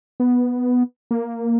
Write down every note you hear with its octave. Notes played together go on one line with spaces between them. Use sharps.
B3
A#3